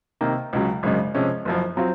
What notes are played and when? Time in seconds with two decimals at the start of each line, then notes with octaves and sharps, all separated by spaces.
0.21 C3 D#3 A#3
0.53 C#2 C#3 F#3
0.83 G#1 F#2 C#3 G#3
1.15 C3 F3 G#3 C#4
1.45 F#1 F#2 F3
1.77 F#3 C4 F4